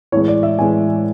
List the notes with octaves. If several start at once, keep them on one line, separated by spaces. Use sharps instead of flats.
A2 E3 G#3 C#5
D5
E5
A2 E3 G#3 G#5